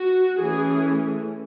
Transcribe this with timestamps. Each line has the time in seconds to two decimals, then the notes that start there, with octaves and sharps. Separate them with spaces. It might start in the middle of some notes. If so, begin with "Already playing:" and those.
Already playing: F#4
0.40 E3 A3 C#4 G#4